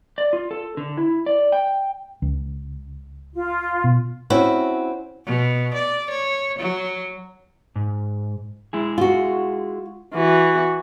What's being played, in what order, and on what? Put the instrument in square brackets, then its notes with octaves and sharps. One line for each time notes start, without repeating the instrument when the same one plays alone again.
[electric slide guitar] D5
F4
A4
D3
E4
D5
G5
[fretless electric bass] C#2
[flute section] F4
[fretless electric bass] B2
[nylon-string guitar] C4 C#4 E4 F#4
[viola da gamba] B2
D5
C#5
F#3
[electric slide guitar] G#2
G#3 E4 G#4
[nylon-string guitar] F4 F#4
[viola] E3 F#4